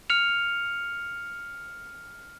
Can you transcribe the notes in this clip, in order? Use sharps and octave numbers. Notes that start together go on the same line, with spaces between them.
F6 C#7 F7